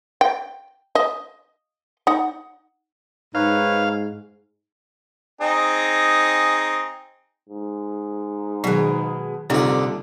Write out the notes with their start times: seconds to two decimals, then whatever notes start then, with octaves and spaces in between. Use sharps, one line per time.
0.21 G5
0.95 D#5
2.07 D#4 F#5
3.35 G#2 D#4 B4 C#5 F5
5.41 C4 D#4 G#4
7.49 G#2
8.64 B2 D#3 F#3 G#3
9.50 C2 F2 A#2 D3 D#4 D5